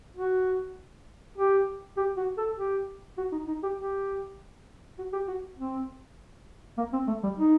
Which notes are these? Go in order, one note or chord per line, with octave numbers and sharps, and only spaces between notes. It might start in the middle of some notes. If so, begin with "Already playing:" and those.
F#4
G4
G4
F#4
A4
G4
F#4
D#4
D#4
G4
G4
F#4
G4
F#4
C4
A#3
C4
A3
G3
D#4